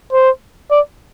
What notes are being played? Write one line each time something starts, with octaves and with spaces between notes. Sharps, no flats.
C5
D5